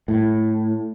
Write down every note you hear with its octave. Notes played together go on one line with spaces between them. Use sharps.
A2